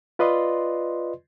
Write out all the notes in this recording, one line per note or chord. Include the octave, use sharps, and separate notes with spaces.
F4 B4 D5 D#5 C6